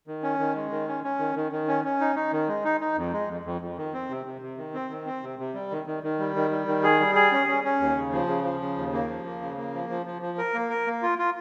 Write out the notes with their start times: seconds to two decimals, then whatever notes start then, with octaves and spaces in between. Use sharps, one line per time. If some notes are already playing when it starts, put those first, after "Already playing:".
0.07 D#3
0.23 C#4
0.39 D#3
0.55 G#3
0.71 D#3
0.88 C#4
1.04 C#4
1.19 D#3
1.36 D#3
1.52 D#3
1.68 C#4
1.84 C#4
2.00 D#4
2.16 D#4
2.32 D#3
2.48 G#3
2.64 D#4
2.81 D#4
2.97 F2
3.13 G#3
3.28 F2
3.45 F2
3.61 F2
3.78 D#3
3.93 C4
4.10 C3
4.26 C3
4.42 C3
4.57 D#3
4.74 C4
4.90 D#3
5.06 C4
5.22 C3
5.39 C3
5.54 G3
5.71 D#3
5.87 D#3
6.03 D#3
6.19 G3
6.36 D#3
6.51 G3
6.67 D#3
6.84 G#4
6.99 G3
7.15 G#4
7.32 C#4
7.48 C#4
7.64 C#4
7.80 D#2
7.96 C#3
8.13 F3
8.28 C#3
8.44 F3
8.61 C#3
8.77 D#2
8.93 A#3
9.09 F3
9.26 A#3
9.41 C#3
9.57 A#3
9.74 F3
9.89 F3
10.06 F3
10.22 F3
10.38 A#4
10.54 A#3
10.70 A#4
10.87 A#3
11.02 F4
11.18 F4